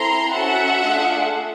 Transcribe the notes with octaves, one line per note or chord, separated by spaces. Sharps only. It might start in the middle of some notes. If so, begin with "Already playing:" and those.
Already playing: C4 E4 A4 A#5 C6
C#4 F#4 A4 E5 F#5
A3 D4 F4 G#4